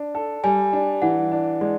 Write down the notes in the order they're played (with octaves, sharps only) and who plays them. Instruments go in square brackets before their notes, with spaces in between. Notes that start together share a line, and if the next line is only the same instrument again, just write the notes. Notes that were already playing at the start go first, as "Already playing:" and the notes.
Already playing: [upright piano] D4
A4
[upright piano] G3 [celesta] G#5
[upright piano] D4
[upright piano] E3 [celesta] F#5
[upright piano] D4
[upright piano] G#3 [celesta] D5